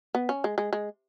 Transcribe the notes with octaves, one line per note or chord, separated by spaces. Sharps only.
B3
C#4
G#3
G#3
G#3